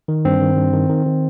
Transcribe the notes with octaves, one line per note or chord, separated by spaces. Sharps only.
D#3
G2 C4
D#3
G2
D#3
D#3
D#3